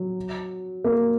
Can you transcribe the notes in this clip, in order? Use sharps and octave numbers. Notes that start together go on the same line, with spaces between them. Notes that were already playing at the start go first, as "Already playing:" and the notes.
Already playing: F#3
A#3